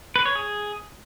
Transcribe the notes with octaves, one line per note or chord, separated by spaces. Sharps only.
B4
C#5
G#4